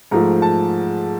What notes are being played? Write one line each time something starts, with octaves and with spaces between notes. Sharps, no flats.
G#2 F3 A3 A#5
A5